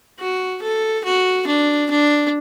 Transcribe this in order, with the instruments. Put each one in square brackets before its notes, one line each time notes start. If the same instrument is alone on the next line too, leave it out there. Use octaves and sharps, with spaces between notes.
[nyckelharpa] F#4
A4
F#4
D4
D4